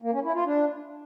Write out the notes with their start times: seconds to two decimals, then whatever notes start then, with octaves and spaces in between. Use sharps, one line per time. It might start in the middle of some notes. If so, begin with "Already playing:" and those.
0.02 A#3
0.13 C#4
0.24 E4
0.35 F4
0.46 D4